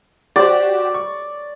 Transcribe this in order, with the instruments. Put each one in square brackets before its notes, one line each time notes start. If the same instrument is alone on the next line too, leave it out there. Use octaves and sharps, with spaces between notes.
[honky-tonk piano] F#4 G4 C5 [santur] D5
[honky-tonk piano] C#6